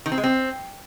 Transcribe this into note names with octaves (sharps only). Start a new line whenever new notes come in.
D#3
C4
G#3
C4